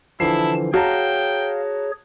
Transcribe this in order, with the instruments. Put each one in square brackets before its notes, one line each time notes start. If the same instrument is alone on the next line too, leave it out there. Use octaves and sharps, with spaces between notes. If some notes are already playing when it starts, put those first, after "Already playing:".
[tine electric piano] D3 E3 F3 [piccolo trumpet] E4 [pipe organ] A5 [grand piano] C7
[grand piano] F#4 A5 A#5 [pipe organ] G#4 C#5 [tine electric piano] F5 [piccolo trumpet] G5